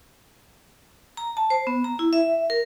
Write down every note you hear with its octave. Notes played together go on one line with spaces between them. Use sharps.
A#5
A5
C5
B3
A#5
E4
E5
A#4